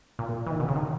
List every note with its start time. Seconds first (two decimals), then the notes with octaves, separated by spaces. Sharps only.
0.19 A#2
0.46 E3
0.51 D#3
0.59 B2
0.68 C#3
0.76 D#3